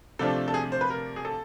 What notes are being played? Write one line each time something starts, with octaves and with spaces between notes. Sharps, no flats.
C3 F3 A3 D4 A4
A4
G#4
C5
B4
A#4
G#4
A4